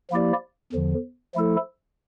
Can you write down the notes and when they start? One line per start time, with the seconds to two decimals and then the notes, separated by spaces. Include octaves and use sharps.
0.10 F3 A#3 E4 G4 D5
0.72 E2 D3 F3
1.35 F3 A3 E4 A4